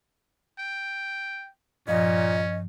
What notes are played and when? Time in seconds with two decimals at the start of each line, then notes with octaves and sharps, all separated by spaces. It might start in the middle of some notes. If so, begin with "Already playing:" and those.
0.59 G5
1.88 G2 A#2 F3 C#4 D#5